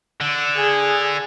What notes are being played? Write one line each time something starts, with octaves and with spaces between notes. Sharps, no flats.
D3
G#4